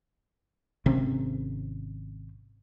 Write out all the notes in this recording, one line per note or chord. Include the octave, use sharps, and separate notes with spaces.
G#1 C3 C4 C#4